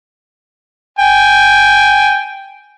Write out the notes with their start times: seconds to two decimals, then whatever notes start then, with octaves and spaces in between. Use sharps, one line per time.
0.99 G5 G#5